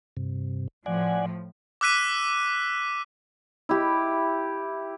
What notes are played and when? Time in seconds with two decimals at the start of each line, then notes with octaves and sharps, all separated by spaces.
0.17 G2 C3
0.86 A2 F3 D5 F#5 G#5
1.81 D6 E6 F#6 B6 D#7
3.69 E4 G4